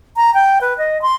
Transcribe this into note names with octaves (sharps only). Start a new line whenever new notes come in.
A#5
G5
B4
D#5
C6